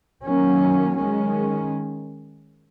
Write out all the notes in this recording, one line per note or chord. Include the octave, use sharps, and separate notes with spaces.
D#3 F#3 A#3 C#4
D#3 G#3 C#4